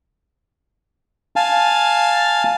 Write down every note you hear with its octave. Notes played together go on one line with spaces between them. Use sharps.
F5 G#5 A5